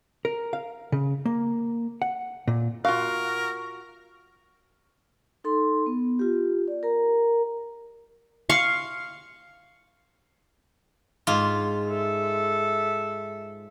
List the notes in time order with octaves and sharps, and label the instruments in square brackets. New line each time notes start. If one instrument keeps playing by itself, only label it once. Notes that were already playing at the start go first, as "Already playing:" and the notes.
[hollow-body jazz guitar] A#4
F5
C#3
A#3
F#5
A#2
[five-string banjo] F4 F5 [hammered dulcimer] F#4 [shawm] A#4
[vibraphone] D#4 A4 C6
B3
F4 G4
D5
A#4 A#5
[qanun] F5 C6 C#6
[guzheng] G#2 F4
[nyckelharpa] A4 E5